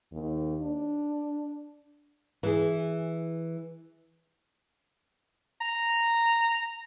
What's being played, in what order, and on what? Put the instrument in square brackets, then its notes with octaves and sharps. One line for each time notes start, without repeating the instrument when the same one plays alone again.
[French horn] D#2
D4
[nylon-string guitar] E3 G#4
[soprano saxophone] A#5